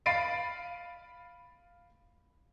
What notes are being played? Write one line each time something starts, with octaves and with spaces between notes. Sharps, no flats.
F5 B5 A6 C7 D7 D#7